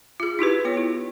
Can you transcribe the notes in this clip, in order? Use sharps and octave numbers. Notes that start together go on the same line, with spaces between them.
F4 G#4
D#4 E4 G4 B4
B3 F4 C#5
E4